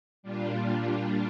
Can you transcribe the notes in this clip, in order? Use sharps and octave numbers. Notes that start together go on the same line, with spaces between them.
A#2 G3 D4 F4